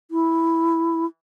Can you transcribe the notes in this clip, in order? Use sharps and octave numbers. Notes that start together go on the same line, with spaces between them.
E4